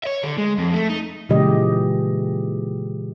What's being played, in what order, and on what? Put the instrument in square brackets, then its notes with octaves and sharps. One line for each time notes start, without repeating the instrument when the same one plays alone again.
[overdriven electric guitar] C#5 E5
D3
G#3
F2
A3
D#4
[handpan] A#2 C#3 E3 G#3 G4 D#5